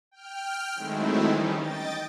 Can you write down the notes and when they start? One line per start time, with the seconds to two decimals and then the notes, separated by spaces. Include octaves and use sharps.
0.11 G5 F6
0.74 D#3 F#3 G#3 A3 C4 E4
1.28 D#3 E3 G3 C#4 D#4
1.57 D#5 G5 A6